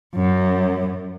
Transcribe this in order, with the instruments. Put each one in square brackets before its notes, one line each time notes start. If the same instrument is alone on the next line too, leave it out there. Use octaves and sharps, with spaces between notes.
[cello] F#2